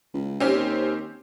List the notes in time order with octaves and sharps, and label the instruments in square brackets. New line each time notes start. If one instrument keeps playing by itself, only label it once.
[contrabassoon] C#2
[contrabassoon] D#2 [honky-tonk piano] C4 C#4 G4